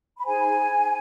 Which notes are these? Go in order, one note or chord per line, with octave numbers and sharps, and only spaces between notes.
B5
D#4 G#4 C5 G#5